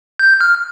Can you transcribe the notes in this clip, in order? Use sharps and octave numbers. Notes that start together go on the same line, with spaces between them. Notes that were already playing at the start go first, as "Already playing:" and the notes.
G6
F6